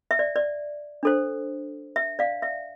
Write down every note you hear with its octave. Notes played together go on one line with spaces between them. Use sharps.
E5
D5
D5
D4 A4 C5
E5
D5 F5
E5